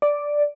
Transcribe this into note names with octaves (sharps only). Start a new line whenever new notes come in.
D5